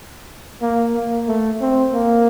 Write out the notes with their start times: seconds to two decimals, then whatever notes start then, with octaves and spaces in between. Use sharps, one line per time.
0.62 A#3
0.95 A#3
1.28 A3
1.61 C4
1.94 A#3